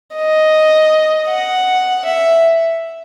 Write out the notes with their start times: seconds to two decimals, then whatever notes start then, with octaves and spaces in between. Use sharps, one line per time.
0.16 D#5
1.29 F#5
2.05 E5